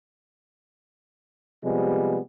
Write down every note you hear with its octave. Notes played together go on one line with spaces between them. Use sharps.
C3 F3 G3 G#3 B3